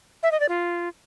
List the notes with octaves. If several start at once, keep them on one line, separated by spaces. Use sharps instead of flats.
E5
D#5
D5
F4